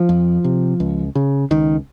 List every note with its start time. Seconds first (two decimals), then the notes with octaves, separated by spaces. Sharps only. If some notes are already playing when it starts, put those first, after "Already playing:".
Already playing: F3
0.09 F2
0.44 C3
0.80 C#2
1.15 C#3
1.51 C#2 D#3